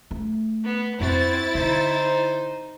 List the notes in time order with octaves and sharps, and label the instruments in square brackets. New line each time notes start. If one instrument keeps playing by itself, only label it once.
[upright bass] A3
[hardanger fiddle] B3
[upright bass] F2 [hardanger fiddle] C4 F#4 [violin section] E4 A6
[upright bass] D3 [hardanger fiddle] D#4 C5